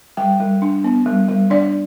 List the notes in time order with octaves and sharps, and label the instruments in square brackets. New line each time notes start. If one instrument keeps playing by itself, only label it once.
[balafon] G3 G5
G3
D4
B3
G3
G3
D4 D5